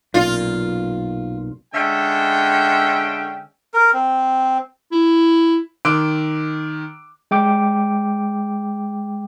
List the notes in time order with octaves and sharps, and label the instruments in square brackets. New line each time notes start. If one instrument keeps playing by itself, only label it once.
[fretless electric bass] B1 F#2 A#2 [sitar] F4
[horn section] D3 G#3 C#4 E5 G5
[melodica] A#4
C4
[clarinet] E4
[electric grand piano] D#3 C6 D6 E6 F#6 D7
[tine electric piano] G#3 G5 D6